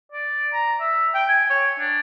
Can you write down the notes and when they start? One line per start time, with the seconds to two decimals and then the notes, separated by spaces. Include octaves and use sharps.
0.12 D5
0.53 A#5
0.80 E5
1.14 G5
1.29 G#5
1.50 C#5
1.79 D4